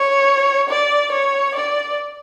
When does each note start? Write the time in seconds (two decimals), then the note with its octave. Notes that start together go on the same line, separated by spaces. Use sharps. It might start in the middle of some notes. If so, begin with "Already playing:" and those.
Already playing: C#5
0.69 D5
1.11 C#5
1.55 D5